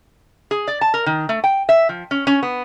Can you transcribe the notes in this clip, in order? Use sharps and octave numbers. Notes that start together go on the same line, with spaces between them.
G#4
D5
A5
A#4
D#3
A3
G5
E5
F3
C#4
C#4
B3